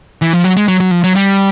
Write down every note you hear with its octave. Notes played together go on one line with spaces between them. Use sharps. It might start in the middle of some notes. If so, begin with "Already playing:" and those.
E3
F3
F#3
G#3
F#3
F#3
F3
F#3
G3